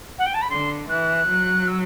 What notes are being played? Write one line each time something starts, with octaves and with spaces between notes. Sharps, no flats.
F#5
G5
A5
B5
D3 C6
E3 F#6
F#3
E6